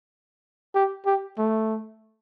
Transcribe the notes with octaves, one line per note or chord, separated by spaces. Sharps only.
G4
G4
A3